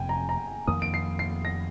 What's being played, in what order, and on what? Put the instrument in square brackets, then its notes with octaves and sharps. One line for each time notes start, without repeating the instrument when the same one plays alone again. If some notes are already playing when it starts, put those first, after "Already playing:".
Already playing: [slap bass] F1 F2 C3 [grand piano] G5 G#5
[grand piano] A#5
A#5
[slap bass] F2 D#3 A#3 [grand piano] D#6
[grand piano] D7
C7
C7
A#6